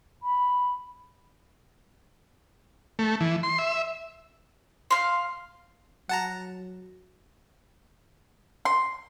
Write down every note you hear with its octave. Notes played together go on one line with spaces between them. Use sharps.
B5
A3
E3
C6
E5
F5 C6
F#3 F#5 A5 A#5
C6